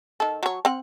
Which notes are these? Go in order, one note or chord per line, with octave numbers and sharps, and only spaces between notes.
D#3 A4
F#3 C#5
C4 F#5